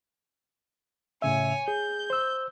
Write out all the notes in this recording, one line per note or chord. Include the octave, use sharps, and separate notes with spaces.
A2 C#3 C#5 E5 G#5
G#4 G6
C5 E6